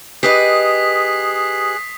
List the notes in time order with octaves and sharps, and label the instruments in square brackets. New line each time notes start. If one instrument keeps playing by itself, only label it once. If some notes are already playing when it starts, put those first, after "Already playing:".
[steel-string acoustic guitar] G4 B4 D#5 [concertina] G#4 F#6 [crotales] D#6 B6 C7